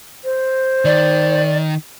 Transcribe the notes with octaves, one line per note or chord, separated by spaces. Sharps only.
C5
D#3 D5